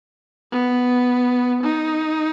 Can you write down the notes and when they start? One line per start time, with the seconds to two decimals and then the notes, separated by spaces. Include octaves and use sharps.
0.52 B3
1.63 D#4